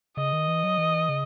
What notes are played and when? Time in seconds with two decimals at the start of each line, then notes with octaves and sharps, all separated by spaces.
0.17 C#3 D#5
0.33 D#3
0.48 E3
0.64 F#3
0.78 E3
1.09 C#3